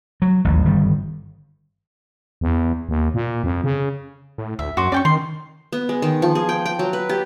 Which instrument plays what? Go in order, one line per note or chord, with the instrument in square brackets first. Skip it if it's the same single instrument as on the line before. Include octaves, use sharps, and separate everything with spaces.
[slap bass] F#3
A1 D#2 F#3
G1 D#3 G3
[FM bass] E2
D#2
A#2
F2
C#3
[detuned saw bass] A2
[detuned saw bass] D2 [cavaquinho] E5
[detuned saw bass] F#2 [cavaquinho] F#4 C6 D6
[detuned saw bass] C#4 [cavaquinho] D5 G5 C#6
[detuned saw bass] D#3 [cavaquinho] C6
[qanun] B3
G#3
D#3
F3
G#4
G5
G5
F#3
B4
G4